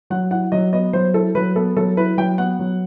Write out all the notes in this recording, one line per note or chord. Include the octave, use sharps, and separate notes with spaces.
F#3 F#5
E4 F#5
F#3 D#5
B3 D#5
F#3 C5
E4 A4
F#3 B4
B3 A4
F#3 A4
E4 B4
F#3 G5
B3 F#5
F#3